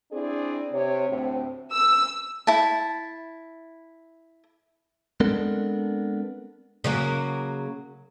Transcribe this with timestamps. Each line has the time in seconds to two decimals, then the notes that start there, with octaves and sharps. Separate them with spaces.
0.12 C4 D4 E4 G#4 D5
0.73 C3 C#5
1.10 D2 A2 C4
1.73 E6
2.47 E4 A5
5.20 G#3 B3 C4 D4 A4 A#4
6.84 C#3 F#3 A#3